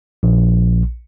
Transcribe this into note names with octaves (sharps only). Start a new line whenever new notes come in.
A#1